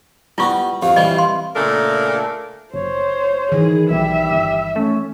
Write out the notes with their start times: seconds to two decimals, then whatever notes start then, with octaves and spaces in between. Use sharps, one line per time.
0.38 G3 B3 E4 F4 C#6
0.82 F2 G4 F5
0.96 C2 E3 G3 D#5
1.19 C6
1.56 A#2 C#3 A3 D4 A4 A#4
2.74 F#1 C5 C#5
3.52 D#3 E3 G#4
3.90 B1 G3 E5
4.31 G1
4.76 A3 C#4